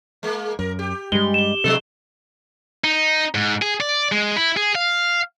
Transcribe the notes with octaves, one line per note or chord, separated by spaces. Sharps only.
G#3 A#3
F#2 A#4
G4
G2 G3 G#3 G7
E7 G7
G2 C3 F3 G#3 A4
D#4
G#2
G#4
D5
G#3
E4
G#4
F5